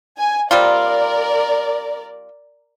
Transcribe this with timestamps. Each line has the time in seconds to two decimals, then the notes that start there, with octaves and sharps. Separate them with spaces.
0.18 G#5
0.51 G3 C4 F4 A#4 D5